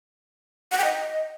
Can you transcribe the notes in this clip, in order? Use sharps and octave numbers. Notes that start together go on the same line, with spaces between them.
F#5
G5
D#5